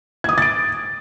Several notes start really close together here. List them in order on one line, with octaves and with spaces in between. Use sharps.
G#6 D#6 D6 A6 D7